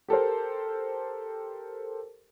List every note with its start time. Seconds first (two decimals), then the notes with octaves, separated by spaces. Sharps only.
0.08 G4 A4 A#4 C5